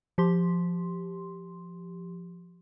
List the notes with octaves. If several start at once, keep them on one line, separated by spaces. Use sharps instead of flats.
F3 G4 C6